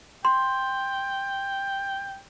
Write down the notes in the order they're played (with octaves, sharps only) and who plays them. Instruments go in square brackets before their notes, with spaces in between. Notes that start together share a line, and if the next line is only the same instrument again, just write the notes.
[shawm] G5 [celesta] C6